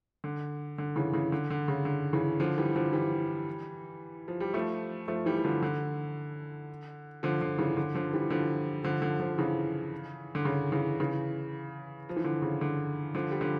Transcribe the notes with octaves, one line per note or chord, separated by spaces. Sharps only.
D3
D3
C#3 E3
C#3 E3
D3
D3
C#3
D3
C#3 E3
D3 F3
E3 G3
D3 F3
E3 G3
F3
G3
F3 A3
F3 A3
E3 G3
G3
D3 F3
D3
D3 F3
D3
C#3 E3
D3
D3 F3
E3 G3
D3 F3
D3 F3
D3 F3
D3 F3
C#3 E3
D3
C#3
C#3 E3
C#3 E3
F3
E3
D3
C#3
D3
D3 F3
G3
D3 F3